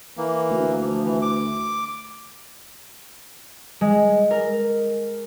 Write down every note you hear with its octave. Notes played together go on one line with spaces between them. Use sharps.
E3 A#3
D2
F3
E3
D6
G#3
A#4